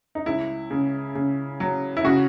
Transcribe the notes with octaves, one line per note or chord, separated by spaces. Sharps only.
D#4
C#2 E4
C#3
C#3
F#3
E4
C#3 F#4